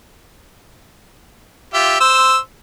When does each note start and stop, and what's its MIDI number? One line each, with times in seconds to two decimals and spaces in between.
1.74 1.96 65
1.74 1.96 67
1.74 1.96 76
2.01 2.37 72
2.01 2.37 88